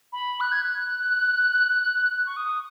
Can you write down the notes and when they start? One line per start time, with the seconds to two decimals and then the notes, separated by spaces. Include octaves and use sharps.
0.13 B5
0.41 F#6
0.52 G#6
0.63 F#6
2.26 C#6
2.37 D#6